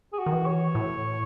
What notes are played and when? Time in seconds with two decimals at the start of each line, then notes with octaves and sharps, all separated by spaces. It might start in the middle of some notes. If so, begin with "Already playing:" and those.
0.13 G#4
0.19 F#4
0.26 D#3
0.32 E3
0.46 C#5
0.75 A2